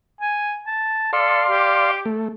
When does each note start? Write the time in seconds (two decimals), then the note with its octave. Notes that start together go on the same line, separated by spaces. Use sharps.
0.21 G#5
0.67 A5
1.13 A4 D5 F5 C6
1.50 G4
2.06 A3